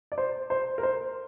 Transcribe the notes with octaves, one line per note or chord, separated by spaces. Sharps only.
D5
C5
C5
A#4
C5